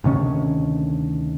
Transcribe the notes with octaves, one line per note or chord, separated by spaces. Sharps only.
D2 C3 D#3 C#4